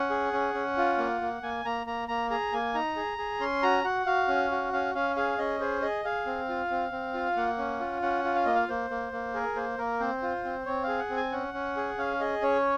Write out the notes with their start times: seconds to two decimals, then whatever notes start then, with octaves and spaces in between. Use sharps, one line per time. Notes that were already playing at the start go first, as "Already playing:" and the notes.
Already playing: C#4 F#5
0.10 G#4
0.33 C#4
0.54 C#4
0.77 F4
0.98 A#3
1.21 A#3
1.42 A#3 G#5
1.65 A#3 A#5
1.86 A#3 A#5
2.08 A#3 A#5
2.30 G#4 A#5
2.53 A#3 G#5
2.74 D#4 A#5
2.96 G#4
3.18 G#4
3.40 C#4 C6
3.63 F#4 A#5
3.84 F#4 F#5
4.06 F#4 F5
4.28 C#4
4.51 F#4
4.73 C#4 F5
4.95 C#4 F5
5.16 G#4 F5
5.38 C#4 D#5
5.60 G#4 C5
5.82 G#4 D#5
6.05 G#4 F5
6.26 C4
6.49 F4
6.71 C4
6.92 C4
7.14 F4
7.36 A#3 F#5
7.58 C#4
7.80 F4
8.02 C#4 F#5
8.24 F4
8.35 F5
8.45 A#3 D#5
8.55 F5
8.69 A#3 C5
8.90 A#3
9.12 A#3
9.34 G#4 A#4
9.56 A#3 C5
9.78 A#3 A#4
10.00 C4 C5
10.22 F4
10.44 C4
10.66 C4 C#5
10.83 G#4 F5
10.99 F#5
11.10 C4
11.16 G#5
11.32 C#4 F#5
11.54 C#4
11.76 G#4
11.98 C#4 F5
12.20 G#4 D#5
12.42 C#4 C#5